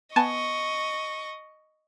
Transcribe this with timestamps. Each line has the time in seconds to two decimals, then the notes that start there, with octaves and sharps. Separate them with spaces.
0.16 B3 D#5 G#5 A5 C#6